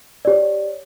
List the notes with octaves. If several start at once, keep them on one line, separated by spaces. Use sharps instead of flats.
G4 C#5 D5